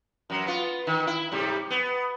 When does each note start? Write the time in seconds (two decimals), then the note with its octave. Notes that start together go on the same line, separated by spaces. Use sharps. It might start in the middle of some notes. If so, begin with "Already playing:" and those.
0.30 F#2 F#3
0.46 B3 F4
0.87 D#3
1.07 E4
1.32 G#2 C3 G3
1.70 B3